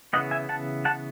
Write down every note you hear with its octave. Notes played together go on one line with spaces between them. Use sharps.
C#3 E3 B3 D#5 F#5
E5 G#5
F#5 A5
F#5 A5